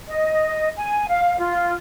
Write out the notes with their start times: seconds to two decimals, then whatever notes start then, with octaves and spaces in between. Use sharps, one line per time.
0.08 D#5
0.77 G#5
1.09 F5
1.39 F4